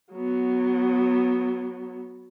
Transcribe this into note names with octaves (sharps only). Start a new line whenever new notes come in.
F#3 B3